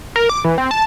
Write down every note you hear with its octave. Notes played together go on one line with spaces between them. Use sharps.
A#4
D6
E3
C4
A5